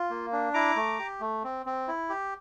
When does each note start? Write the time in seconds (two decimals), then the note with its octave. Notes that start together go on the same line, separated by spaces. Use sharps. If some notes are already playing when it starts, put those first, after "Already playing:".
Already playing: F4
0.10 A#3
0.32 D4
0.54 E4 A#5 D6
0.76 A3
0.99 G4
1.21 A3
1.44 C4
1.66 C4
1.88 E4
2.10 G4